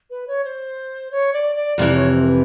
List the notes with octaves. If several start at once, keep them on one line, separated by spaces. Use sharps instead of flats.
B4
C#5
C5
C#5
D5
D5
F2 C3 E3 D5
C#5
C5
A#4
B4